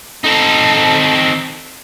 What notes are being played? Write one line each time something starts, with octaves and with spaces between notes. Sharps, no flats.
C4 D#4 A4 A5